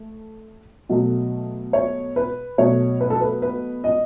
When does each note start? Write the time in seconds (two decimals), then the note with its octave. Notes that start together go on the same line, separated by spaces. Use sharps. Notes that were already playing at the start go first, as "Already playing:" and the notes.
Already playing: A3
0.89 B2 F#3 A3
1.73 C#5
2.16 B4
2.58 B2 F#3 A3 C#5
3.01 B4
3.10 A4
3.21 B4
3.42 B4
3.84 D#5